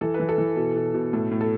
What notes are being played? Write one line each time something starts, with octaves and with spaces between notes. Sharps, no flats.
E3 A4
B4
E3
A4
E3
B2
B2
B2
A2 A4
A2
A4